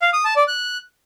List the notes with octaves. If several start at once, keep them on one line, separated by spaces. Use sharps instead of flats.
F5
D#6
A5
D5
F#6